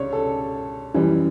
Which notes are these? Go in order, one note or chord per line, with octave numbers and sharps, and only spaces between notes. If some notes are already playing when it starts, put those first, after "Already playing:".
Already playing: C#2 C#5 D5
A4
F#2 E3 G3